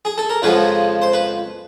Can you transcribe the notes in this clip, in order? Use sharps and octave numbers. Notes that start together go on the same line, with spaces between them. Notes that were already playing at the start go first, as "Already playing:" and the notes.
G#4
A4
A#4
F2 C#3 F3 G#3 B3 B4
C5
B4